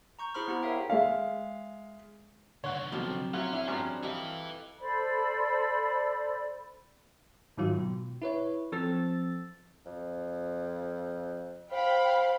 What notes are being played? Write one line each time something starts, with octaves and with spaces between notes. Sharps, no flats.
A#5 C#6 G6
E4 G#4 C5 B5 C6 F6
B3 E4 G4 A#5
A#4 C#5 E5 F5 G5
G#3 E5 F5
C2 D3 C#5 F#5
F2 B2 F3 F#3 G4 A4
F#3 C#4 E4 F4 F5 F#5
D4 E4 G#4 C5
G2 F3 F#3
E4 G4 A4 B4 D#5 F5
A4 C5 D5 B5
G#2 D#3 F#3 F4
B2
E4 B4 C#5
F3 C4 A4 E6 A6
F2
C5 F5 G5 B5